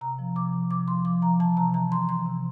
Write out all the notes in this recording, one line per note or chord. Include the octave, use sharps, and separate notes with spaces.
C3 A#5
F3
C3 D6
F3
C3 D6
F3 C6
F3 D6
F3 A#5
E3 A5
C3 A#5
E3 A#5
E3 C6
E3 C6
C3